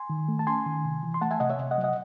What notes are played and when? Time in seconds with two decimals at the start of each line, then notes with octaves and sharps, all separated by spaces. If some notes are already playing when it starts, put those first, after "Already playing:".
Already playing: G#5 C6
0.10 D#3
0.28 A3
0.39 A5
0.47 C#4 G#5 C6
0.66 D#3
0.85 C3
1.03 E3
1.14 C6
1.21 A3 F#5 A5
1.31 E5 G#5
1.40 C3 D#5 F#5
1.50 C#5 E5
1.59 C3
1.71 D#5 F#5
1.78 F#3
1.84 D#5 F#5